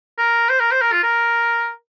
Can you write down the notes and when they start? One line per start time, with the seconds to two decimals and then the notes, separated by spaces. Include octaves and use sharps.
0.18 A#4
0.50 C5
0.60 A#4
0.72 C5
0.82 A#4
0.92 F4
1.03 A#4